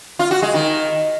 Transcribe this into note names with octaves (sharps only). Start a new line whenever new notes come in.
F4
F#4
G#3
D#3